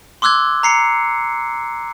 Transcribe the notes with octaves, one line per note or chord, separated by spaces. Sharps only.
C6 D6 E6 F#6 G#6
A#5 C7 C#7